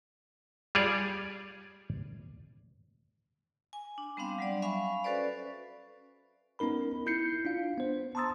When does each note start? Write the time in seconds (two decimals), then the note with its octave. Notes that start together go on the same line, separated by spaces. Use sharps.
0.75 G3 F4 G#4 C#5 D5
3.73 G#5
3.98 D4
4.17 G3 B3 C4 D4 F5
4.39 F#3 G3 D5
4.62 E5 F5 G#5 B5 C#6
5.04 C#4 F#4 A4 B4 C5 D5
6.59 B3 C#4 D#4 A#4 B5
7.06 E4 G6 C7 C#7
7.45 D4 F4 F5
7.78 B3 C5
8.15 A5 A#5 C6 D#6 E6 A6